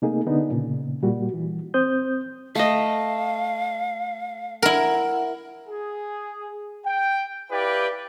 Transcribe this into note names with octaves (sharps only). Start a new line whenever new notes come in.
C3 A3 A#3 D#4 G#4
D3 B3 D4 D#4
A#2 C#3
A#2 G3 F#4
E3
C4 C5 D#6 G6
A3 D#5 F5
E4 A#4 F#5
G#4
G5
E4 G4 B4 D5 F5 G5